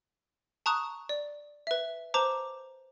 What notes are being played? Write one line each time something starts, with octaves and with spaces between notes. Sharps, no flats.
A5 A#5 C#6 D#6 F#6
D5
B4 E5
B4 C5 A5 A#5 D6